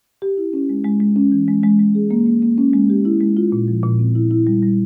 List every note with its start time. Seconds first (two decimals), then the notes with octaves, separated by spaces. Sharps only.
0.22 G4
0.37 E4
0.53 C#4
0.69 G#3
0.84 G#3
1.00 G#3
1.16 C#4
1.32 E3
1.48 G#3
1.64 G#3
1.79 G#3
1.95 G#4
2.11 A#3
2.26 A#3
2.42 A#3
2.58 C#4
2.73 G#3
2.90 G4
3.05 E4
3.21 G#3
3.37 F4
3.52 A#2
3.68 F3
3.84 A#2
3.99 C4
4.15 E4
4.31 E4
4.47 G3
4.62 G3